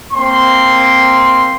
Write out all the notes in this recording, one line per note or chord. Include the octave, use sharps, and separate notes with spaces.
A#3 C4 C6